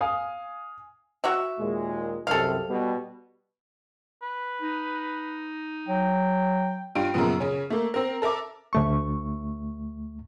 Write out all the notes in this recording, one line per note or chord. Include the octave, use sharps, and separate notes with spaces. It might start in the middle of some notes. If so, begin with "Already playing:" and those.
F5 G#5 D#6
F#4 C#5 E5
D#2 A#2 G#3
C2 F#2 C3 A4 F5
B2 G3
B4
D#4
F#3 G5
G2 F4 G4 D7 D#7
F#2 A#2 C#3 F3 B3
C#3 C#4
A3 A#3
C4 A#4
A4 A#4 E5 D6
D2 A3 C#6